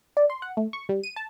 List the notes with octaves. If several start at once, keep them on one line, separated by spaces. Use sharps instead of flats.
D5
C6
F#5
A3
C#6
G3
D#7
A5